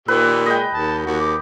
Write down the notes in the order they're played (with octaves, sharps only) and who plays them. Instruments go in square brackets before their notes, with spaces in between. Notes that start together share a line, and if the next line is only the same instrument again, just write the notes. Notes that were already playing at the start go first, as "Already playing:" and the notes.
[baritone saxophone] A#2 [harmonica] D#3 G4 E6 [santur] B4
[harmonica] G#3 [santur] D#5 G5
[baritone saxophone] D#2 [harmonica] A5
[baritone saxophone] D#2 [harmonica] F#4
[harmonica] D6